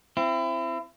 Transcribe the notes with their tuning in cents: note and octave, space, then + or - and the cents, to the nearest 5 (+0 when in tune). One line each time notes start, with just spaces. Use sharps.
C4 +0 E4 +30